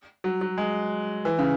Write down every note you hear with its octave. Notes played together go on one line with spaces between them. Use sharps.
F#3
F#3
G#3
E3
C#3